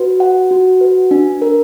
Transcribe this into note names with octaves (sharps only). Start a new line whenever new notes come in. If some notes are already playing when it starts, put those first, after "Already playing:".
Already playing: F#4 B4
F#5
F#4
B4
D4
A#4